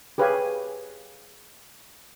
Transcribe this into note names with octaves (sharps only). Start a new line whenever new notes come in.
G4 G#4 B4 C#5 F5 G#5